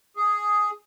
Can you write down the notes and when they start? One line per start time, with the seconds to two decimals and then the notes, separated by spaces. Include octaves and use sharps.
0.17 G#4